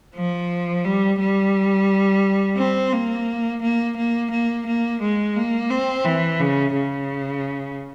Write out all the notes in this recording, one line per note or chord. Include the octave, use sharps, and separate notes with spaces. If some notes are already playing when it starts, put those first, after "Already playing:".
F3
G3
G3
C4
A#3
A#3
A#3
A#3
A#3
G#3
A#3
C4
E3
C#3
C#3